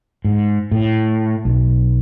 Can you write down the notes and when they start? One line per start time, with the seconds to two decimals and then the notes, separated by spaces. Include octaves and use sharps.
0.25 G#2
0.72 A2
1.45 B1